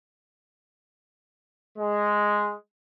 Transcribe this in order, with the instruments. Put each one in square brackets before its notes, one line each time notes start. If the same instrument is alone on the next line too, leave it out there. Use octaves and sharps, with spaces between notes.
[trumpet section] G#3